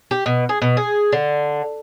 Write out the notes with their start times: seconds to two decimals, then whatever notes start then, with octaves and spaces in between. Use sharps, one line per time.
0.11 G4
0.26 B2
0.49 G#4
0.62 B2
0.77 G#4
1.12 D3